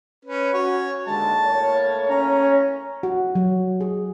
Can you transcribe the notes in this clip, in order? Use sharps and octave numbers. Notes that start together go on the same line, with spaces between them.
C#4 B4
C#4 F#4 C#5
D#2 D3 G#3 A5
A2 A#3 C#5
C#4 A#5
F#4
F#3
G#4